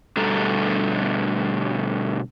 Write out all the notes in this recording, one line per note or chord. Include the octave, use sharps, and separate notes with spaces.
B2 D3 G3 A3 A4 A#5